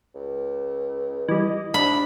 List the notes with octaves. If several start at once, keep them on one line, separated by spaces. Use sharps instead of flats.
C#2
E3 G3 D#5
C3 D4 B5